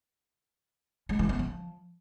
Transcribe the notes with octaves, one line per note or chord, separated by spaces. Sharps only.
G#3
E3
B3
F3